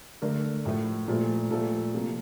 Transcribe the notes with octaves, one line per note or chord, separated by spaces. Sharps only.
D3 A3 A#4
A2 F3 A3
A#2 F3 A3
A#2 F3 A3 A4
C3 F3 A#3